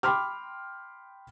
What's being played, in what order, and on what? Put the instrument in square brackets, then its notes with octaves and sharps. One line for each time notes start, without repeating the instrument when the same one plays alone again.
[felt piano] G5 B5 C6 D6 F6